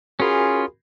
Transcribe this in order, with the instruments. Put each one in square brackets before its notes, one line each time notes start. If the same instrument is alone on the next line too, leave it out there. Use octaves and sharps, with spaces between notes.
[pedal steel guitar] C#4 F4 [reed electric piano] F#4 A#4 B5 [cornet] G#4